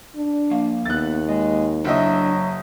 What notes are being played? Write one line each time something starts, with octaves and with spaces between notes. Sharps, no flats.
D4
F3 A#3 F5
D#2 A3 B3 F#6 A6
G#3 D#5
F#1 F#3 D4 E4 D#5